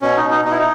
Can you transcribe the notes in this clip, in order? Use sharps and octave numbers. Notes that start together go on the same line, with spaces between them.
B2 C#4
D#4
B2
D#4
B2 D#4
E4
D#4